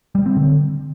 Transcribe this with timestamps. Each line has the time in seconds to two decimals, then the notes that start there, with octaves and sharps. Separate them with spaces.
0.15 G3
0.26 C4
0.37 D3